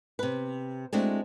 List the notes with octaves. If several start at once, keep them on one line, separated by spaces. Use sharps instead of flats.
C3 B4
G#3 A3 C4 D4 E4 F#4